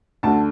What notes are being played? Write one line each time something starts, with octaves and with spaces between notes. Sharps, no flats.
D2 D3 A5